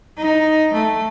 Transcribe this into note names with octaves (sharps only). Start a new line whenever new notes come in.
D#4
A3